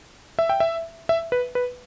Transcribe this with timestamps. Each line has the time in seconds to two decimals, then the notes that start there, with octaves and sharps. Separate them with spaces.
0.39 E5
0.49 G5
0.60 E5
1.09 E5
1.32 B4
1.55 B4